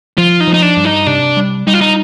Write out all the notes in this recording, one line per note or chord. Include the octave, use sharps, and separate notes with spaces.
F3 F4
D#4
F3
D#4
D4
G2
D#4
C3 D4
G3
G3 D#4
F4
D#4